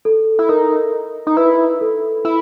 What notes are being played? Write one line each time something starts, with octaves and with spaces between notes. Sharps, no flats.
A4
E4
D#4 A#4
D#4
E4 B4
A4
E4